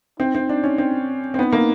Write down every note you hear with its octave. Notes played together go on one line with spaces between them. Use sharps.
C4 D#4
C4
D4
C#4
C4
C4
B3 D#4
A#3